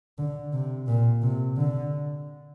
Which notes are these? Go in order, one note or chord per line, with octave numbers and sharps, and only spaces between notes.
D3
C3
A#2
C3
D3